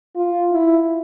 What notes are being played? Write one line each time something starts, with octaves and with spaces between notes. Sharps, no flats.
F4
E4